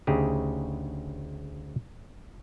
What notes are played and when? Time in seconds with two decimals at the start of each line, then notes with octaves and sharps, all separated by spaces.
0.07 D2 C#3 D#4 G4 G#4